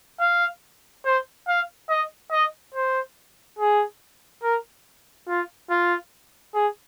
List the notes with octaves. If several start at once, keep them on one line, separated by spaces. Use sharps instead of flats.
F5
C5
F5
D#5
D#5
C5
G#4
A#4
F4
F4
G#4